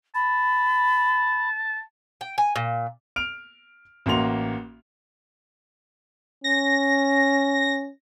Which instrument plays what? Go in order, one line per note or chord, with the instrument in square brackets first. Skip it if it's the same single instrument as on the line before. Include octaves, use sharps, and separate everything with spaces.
[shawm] A5 [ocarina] B5
[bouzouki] G5
G#5
A#2
[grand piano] F6 D7 F7
A1 A#3 F#4 C6 F7
[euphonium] C#4 [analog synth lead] A#6